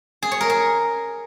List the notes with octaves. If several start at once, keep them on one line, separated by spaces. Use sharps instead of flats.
G#4
C#5
A#4
G#4